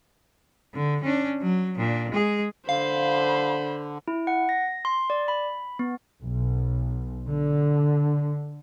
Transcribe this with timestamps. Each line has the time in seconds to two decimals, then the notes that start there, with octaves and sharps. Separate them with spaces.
0.74 D3
1.04 C#4 D4
1.42 F#3
1.78 A#2 D4
2.10 G#3 G#4
2.69 D3 C5 F5 B5
4.08 E4
4.27 F#5
4.49 A#6
4.85 C6
5.10 D5
5.28 B5
5.79 B3
6.21 B1
7.28 D3